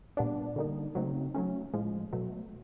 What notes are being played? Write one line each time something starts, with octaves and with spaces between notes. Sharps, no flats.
A#2 G3 B3 D4
D3 G3 A#3 D#4
C#3 F#3 A3 C4 D#4
F#3 A3 C#4
A2 F3 G#3
B2 F#3 A3